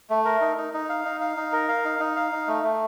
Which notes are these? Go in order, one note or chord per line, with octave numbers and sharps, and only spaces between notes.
A3
A#4
D#4
D#4
D#4
F5
D#4
F5
D#4
A#4
F5
D#4
D#4
F5
D#4
A3
A3